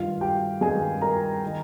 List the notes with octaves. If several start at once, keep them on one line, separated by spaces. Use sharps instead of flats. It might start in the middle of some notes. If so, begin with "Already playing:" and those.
Already playing: G2 D#3 F4 F5
G4 G5
G2 D#3 G#4 G#5
A#4 A#5
D#3